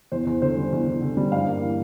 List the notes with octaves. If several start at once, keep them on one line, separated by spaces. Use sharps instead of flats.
E2 C5
E2
D3 C5
G3
E2
E2
D3
G3
G2 F5
A#3
E3